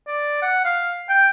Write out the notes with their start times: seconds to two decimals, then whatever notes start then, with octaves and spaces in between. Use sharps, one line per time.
0.07 D5
0.42 F#5
0.64 F5
1.09 G5